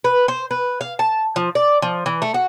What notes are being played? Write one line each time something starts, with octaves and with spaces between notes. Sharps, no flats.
B4
C5
B4
F5
A5
F3
D5
F3
E3
A3
F#4